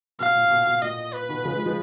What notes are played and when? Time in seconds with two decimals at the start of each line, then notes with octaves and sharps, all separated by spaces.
0.20 B2 F5
0.35 A#2
0.51 B2
0.67 B2
0.82 A#2 D#5
1.14 B4
1.29 B2 D#3
1.45 C#3 F3
1.55 F3 G#3
1.66 F3 G#3